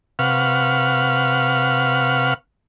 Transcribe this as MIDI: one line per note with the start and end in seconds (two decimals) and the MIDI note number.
0.19 2.34 48
0.19 2.34 71
0.19 2.34 77
0.19 2.34 78
0.19 2.34 85
0.19 2.34 89